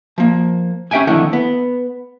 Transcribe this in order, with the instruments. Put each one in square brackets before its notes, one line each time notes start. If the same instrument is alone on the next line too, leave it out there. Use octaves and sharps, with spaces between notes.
[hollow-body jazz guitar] F3 A#3
C#4 G4 E5 G5 G#5
F2 D3 D#3 A3 E4 F#5
B3